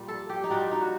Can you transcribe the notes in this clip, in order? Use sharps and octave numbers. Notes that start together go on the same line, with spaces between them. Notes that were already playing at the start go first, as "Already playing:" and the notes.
Already playing: A#2 G3
A4
G4
D#4
A#2 G3 F#4
D#4
F#4